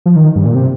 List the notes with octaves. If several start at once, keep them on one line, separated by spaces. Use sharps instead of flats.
F3
D#3
G2
A#2
C3